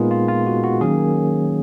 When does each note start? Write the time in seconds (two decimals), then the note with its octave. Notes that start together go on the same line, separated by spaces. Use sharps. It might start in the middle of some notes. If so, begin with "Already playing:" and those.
Already playing: A#2 G#3 B3 D#4 F4 G#4 A#4 B4
0.11 F4
0.28 F4
0.47 F#4
0.64 F#4
0.81 D#3 F#3 A#3 C#4 G#4